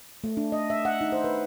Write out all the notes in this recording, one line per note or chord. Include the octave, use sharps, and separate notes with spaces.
A3
D4
D#5
E5
F#5
D#4
C5
B4